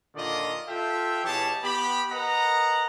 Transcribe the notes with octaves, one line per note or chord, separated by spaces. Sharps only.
A#2 D3 D#3 F4 D5 D#5
F4 A4 E5 F5 G5
B2 E3 G4 G#4 C#5 A5
B3 G4 B5
A#4 B4 D#5 F#5 A#5